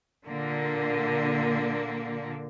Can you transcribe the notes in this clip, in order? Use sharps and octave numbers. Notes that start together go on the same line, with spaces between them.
A#2 D3 A#3